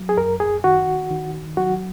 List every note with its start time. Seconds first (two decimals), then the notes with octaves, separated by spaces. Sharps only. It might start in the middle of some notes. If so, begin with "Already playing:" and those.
Already playing: F#3
0.09 G#4
0.17 F#2 A#4
0.40 G#4
0.64 D#3 F#4
1.11 D#3
1.57 F#3 F#4